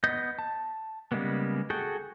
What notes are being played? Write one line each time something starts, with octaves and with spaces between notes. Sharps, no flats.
B3 D#5 D#6 G6
A5
C#3 G3 G#3 A#3 B3
F#4 G#4 A4 G5